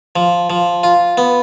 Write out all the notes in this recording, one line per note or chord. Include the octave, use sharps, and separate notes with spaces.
F3
F3
F4
B3